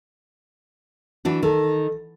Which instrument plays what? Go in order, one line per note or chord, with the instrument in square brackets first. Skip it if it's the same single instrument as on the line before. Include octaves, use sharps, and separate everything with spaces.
[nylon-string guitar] E3 D4 F#4
[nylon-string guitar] D#3 [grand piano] A4